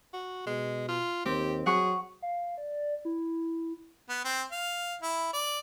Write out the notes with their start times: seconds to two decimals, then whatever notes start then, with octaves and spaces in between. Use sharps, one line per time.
0.13 F#4
0.47 B2 G#3
0.88 F4
1.26 D#2 C4 G4
1.66 F#3 G#4 F#5 C#6
2.22 F5
2.58 D5
3.05 E4
4.09 B3
4.25 C4
4.52 F5
5.02 E4
5.33 D5